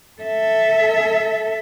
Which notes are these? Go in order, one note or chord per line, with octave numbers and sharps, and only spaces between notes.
A4 E5